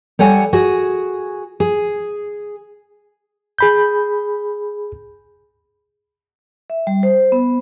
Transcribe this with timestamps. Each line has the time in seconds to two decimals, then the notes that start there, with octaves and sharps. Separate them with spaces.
0.19 G3 A4 C#5 F#5 G#5
0.53 F#4 G#4
1.60 G#4
3.59 G#4 B5 G6
6.70 E5
6.87 G3
7.03 C5
7.32 B3